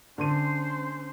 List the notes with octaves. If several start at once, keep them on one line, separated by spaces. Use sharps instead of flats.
D3 C#4 C5 C6 D#7